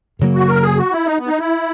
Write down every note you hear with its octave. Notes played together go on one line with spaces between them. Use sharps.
F#2 C#3 F#3 A#3
F#4
A#4
G#4
F#4
E4
D#4
B3
D#4
E4